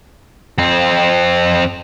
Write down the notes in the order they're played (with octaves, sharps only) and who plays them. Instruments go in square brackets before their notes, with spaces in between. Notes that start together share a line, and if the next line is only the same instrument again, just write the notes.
[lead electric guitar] F2 C4